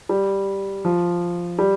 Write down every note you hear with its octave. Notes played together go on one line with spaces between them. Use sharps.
G3
F3
G3